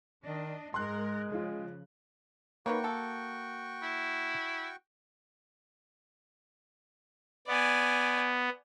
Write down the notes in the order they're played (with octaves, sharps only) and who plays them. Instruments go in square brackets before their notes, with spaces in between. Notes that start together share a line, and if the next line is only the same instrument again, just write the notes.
[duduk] D#3 [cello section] D4 D#5
[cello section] G#2 A#4 [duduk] G#3 [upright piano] C6 F#6
[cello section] C#3 F3 [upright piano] F4 G#4
[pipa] D#3 B4 C#5 [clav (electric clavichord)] A#3 [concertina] F#4 G5 C#6
[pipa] A4
[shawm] E4
[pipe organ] B3 [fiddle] D5 G#5